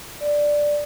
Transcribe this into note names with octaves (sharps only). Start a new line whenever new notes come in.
D5